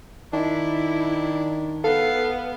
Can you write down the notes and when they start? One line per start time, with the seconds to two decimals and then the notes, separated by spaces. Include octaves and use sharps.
0.33 D#3 D4 E4
1.84 B3 A4 F5